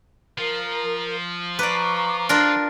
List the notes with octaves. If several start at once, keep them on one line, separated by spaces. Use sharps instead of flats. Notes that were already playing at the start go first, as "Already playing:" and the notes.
F3 A#4
B4 D5 A#5 C#6 D6
D4 F4 A#4